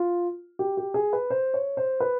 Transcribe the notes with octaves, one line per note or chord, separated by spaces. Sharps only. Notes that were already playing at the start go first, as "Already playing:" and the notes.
Already playing: F4
G4
G4
G#4
B4
C5
C#5
C5
B4